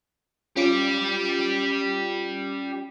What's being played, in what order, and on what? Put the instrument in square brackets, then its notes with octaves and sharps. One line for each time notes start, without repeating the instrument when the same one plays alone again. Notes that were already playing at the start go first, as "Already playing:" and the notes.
[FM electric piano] C#4 F4 [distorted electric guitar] G4 D5